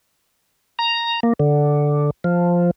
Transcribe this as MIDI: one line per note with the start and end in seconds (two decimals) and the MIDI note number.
0.79 1.20 82
1.23 1.33 58
1.39 2.10 50
2.24 2.71 53